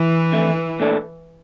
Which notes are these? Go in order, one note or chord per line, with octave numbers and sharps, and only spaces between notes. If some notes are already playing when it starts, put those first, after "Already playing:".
Already playing: E3
F2 D3 A3
A#2 A3 D4 A4 D5